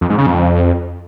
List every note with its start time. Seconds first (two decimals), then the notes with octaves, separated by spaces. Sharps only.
0.01 F2
0.10 G#2
0.18 C#3
0.27 F2